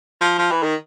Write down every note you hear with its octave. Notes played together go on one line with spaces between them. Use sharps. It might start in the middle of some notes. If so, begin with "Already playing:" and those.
F3
F3
E3
D#3